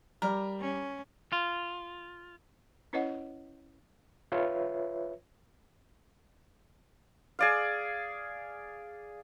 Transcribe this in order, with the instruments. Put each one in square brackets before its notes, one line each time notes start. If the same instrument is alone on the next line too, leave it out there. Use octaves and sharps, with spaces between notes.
[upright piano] G3 [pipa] A#4
[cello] C#4
[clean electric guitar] F4
[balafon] C#4 E4 B4 C#5 D#5 F#5
[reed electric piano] F4 B4 C#5 E5
[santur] G#4 D5 F5